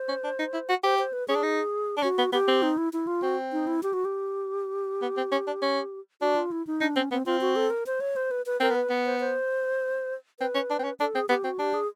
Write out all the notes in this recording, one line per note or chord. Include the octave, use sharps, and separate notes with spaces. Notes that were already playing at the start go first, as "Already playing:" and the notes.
Already playing: C5
C#4
D4
D#4
E4
F#4
G4 C5
C5
B4
C#4 G#4
D4
D#4
D4
C#4 F#4
B3
B3 G4
C4
D#4
E4
E4
F4
C4 F#4
D#4
E4
G4
F#4
G4
B3
C4
C#4
D4
C#4
D4 F#4
F4
E4
D#4
D4 D#4
C4 C#4
B3 C4
C4 F4
F#4
A4
A#4
C5
C#5
C5
B4
B4
C4 A#4
B3 B4
B3
C5
C5
C4 B4
C#4
D4
C4
C#4
D4 A4
C4 G#4
B3 G4
C4 F#4
D4 G4
G#4